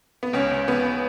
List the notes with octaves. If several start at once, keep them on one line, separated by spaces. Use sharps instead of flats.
B3
C#2 C#4
C#2
C#2 B3